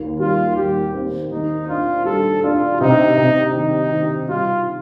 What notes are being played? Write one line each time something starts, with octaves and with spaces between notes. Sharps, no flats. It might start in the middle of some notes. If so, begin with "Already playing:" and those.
Already playing: D#2
G3 F4
G3 G4
C4
D#3 D#4
D4 F4
G3 A4
D4 F4
C3 D#4
C3
D#3 D#4
D#3
G3 F4